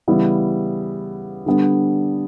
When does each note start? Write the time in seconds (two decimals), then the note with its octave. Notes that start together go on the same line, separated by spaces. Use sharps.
0.08 C#3 E3 G3 B3 E4
1.46 D3 G3 B3 D4